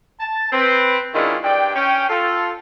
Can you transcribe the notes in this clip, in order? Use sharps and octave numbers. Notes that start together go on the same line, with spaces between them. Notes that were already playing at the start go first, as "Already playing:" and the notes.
A5
C4 B4
D#3 G#3 C#4 D4 E4 F4
G2 D5 G5
C#4 G5
F4 A4